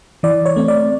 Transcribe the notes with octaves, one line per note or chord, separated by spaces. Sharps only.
E3 D5
C#5
A3 C4
D5